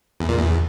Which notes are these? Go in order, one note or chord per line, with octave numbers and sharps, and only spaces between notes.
E2
A#2
E2